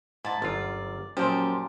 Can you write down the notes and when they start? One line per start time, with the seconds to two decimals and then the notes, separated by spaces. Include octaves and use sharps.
0.25 G#2 E4 A5
0.42 G1 F#2 F4 D5
1.17 F#2 A#2 F3 G4 C5